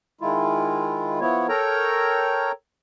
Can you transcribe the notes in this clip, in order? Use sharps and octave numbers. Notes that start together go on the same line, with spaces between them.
D#3 G#3 E4 F4
F3 B3 E4 C#5
A4 A#4 C#5 G5 A#5